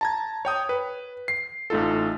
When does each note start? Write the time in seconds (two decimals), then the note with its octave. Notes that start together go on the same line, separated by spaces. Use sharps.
0.01 A5 A#5 G#6
0.45 C#5 G5 D#6
0.69 B4
1.28 C7
1.70 A1 A3 D#4 F4 A4